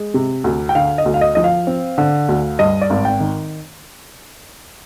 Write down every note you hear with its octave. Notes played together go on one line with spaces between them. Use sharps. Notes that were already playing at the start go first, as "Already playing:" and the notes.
Already playing: G#3
C3
D2
G5
D3 F5
D#5
D2
F5
D#5
F3 D#5
F5
C4
D3
D2
G2 D#5
D5
G#1
G5
D#3